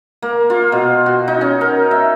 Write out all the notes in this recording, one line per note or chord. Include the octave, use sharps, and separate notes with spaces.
A#3
F4
B2
F#4
D#4
C#4
A#4
E5